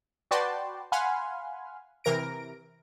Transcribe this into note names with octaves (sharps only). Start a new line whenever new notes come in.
F#4 B4 D5 G5 A5 C6
F5 F#5 G#5 B5 C6 F6
C3 E3 A#4 A#6 D7